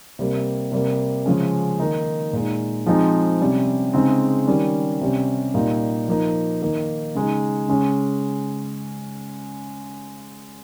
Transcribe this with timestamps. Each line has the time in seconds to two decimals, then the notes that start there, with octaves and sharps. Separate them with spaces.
0.19 C3 G3 A#3
0.72 C3 G3 A#3
1.26 C#3 F3 G#3 C#4
1.80 D#3 A#3 D#4
2.33 A#2 G#3 D#4
2.86 F3 G#3 C4 D#4
3.40 C3 G3 C#4
3.93 C#3 G#3 C4 D#4
4.48 D#3 G3 C#4
5.01 C3 G3 C#4
5.54 A#2 G3 A#3 D#4
6.08 F3 A#3 D#4
6.62 D#3 A#3 D#4
7.15 C#3 G#3 D#4
7.68 C#3 G#3 C#4